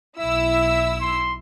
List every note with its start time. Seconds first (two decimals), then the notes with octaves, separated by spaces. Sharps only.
0.19 B1 E4 E5 E6
1.01 C6